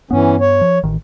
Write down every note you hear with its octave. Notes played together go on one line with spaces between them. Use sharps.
G2 E3 B3 C#4
C#5
F3
A1 D#3